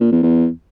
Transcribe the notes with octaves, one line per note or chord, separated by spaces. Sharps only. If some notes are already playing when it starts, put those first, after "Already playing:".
A#2
E2
E2